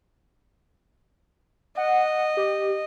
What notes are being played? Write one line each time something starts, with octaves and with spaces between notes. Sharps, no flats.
D#5 F#5
G4